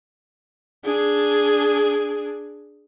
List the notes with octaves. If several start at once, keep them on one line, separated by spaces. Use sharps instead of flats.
D4 G#4